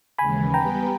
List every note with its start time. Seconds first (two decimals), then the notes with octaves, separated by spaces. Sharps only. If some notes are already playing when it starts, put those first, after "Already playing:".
0.18 D#2 C#3 E3 G#3 G#5 B5
0.53 G3 B3 G4 B4 G5 A#5